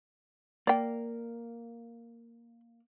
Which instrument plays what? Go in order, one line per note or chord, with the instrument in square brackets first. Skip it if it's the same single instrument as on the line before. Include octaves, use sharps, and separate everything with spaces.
[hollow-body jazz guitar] A#3 [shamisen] D5 G5